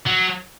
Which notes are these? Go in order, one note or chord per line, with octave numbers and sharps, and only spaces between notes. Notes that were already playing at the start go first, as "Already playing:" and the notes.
F#3